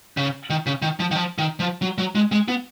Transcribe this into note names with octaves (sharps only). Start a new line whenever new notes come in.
C#3
D#3
C#3
D#3
F3
D#3
F3
D#3
F3
F#3
F#3
G#3
G#3
B3